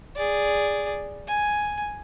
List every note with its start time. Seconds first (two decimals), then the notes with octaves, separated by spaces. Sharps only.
0.16 G#4 D5
1.28 G#5